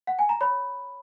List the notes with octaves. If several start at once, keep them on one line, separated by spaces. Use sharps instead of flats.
F#5
G#5
A#5
C#5 B5